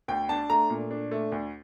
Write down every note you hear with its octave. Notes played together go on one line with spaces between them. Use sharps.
D2 G5
D4 A5
A3 A#5
A#2
D4
A3
D2